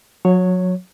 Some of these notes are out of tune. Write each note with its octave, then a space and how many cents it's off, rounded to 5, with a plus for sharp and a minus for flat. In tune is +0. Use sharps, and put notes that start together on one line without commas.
F#3 -30 C#5 +0